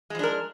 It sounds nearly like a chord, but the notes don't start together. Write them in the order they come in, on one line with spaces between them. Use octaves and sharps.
G#3 F3 D4 A#4